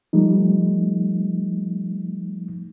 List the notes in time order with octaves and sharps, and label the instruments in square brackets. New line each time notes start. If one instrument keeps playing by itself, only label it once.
[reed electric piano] F3 G3 A3 D#4